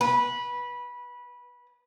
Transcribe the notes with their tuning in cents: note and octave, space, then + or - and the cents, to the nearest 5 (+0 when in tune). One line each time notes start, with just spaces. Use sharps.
B4 -15